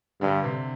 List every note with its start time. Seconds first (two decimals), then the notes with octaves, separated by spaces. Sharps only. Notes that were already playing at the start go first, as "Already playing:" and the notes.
0.21 G2 D3
0.44 C3